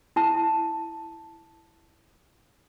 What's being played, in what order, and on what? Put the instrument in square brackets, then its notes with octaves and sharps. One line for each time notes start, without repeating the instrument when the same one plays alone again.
[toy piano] E4 A5